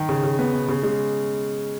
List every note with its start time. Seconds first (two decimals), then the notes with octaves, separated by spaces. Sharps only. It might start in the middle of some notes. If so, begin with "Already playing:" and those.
Already playing: D#3
0.09 C#3
0.23 C#3
0.39 B3
0.53 B2
0.68 C#3
0.83 G#3